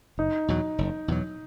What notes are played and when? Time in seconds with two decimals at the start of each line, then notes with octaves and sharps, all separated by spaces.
0.18 F#1 D#4
0.48 E2 B2 F#3
0.78 F#1
1.08 E2 B2 F#3